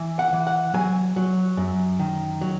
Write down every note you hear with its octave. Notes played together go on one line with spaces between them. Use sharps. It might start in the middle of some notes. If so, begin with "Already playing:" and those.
Already playing: E3
F#5
E3
F#5
F#3 G#5
F#3
F#2
D#3
F#3